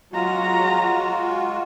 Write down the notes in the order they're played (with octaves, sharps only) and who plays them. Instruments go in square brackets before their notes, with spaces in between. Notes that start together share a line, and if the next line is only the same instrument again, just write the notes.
[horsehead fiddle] F#3 A#5 [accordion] G#3 F4 F#4